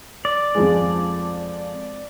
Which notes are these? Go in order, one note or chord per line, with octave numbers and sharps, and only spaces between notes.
D5
F2 F3 G#3